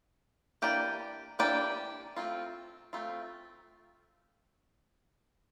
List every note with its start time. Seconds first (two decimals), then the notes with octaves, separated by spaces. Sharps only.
0.62 E3 A#3 D4 G4 D5
1.39 E3 A#3 D4 G4 D5
2.17 A3 C4 F4
2.93 A3 C4 F4